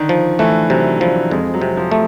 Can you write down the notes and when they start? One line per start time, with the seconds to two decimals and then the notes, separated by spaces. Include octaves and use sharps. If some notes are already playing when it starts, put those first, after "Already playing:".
Already playing: D3 D#3
0.09 F3
0.39 E3 A3
0.70 C3 F#3
1.00 F3 G3
1.31 F2 G#3
1.54 F#3
1.61 C3
1.77 F3
1.91 A3